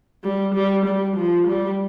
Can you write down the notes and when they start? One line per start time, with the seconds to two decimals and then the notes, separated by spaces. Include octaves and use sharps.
0.24 G3
0.55 G3
0.86 G3
1.16 F3
1.47 G3